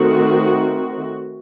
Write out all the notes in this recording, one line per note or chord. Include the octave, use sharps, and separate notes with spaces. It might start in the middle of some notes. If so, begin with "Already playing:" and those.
Already playing: D#3 A3 C4 F#4